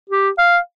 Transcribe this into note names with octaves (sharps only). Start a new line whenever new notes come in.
G4
F5